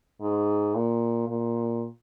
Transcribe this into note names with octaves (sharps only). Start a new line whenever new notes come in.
G#2
A#2
A#2